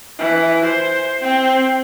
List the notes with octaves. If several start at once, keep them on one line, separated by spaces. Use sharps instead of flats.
E3
C5
C4